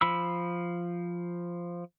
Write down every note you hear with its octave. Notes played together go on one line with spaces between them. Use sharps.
F3 B5 E6